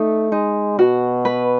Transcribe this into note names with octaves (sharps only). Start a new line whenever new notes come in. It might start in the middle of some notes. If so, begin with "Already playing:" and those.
Already playing: A3 D#4
G#3 D#4
B2 F#4
B4